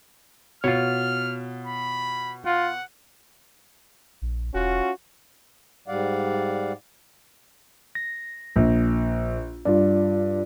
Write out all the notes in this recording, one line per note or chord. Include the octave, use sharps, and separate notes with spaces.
B2 F4 C#5 F6
B5
F4 F#5
A#1
E1 C#4 F4 F#4
G#2 G3 D5 F5 F#5
A#6
A#1
G2 F4 D5